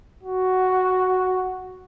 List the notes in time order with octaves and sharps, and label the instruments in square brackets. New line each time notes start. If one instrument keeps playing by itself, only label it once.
[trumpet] F#4